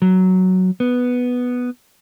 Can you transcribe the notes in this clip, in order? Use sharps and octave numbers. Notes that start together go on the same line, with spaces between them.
F#3
B3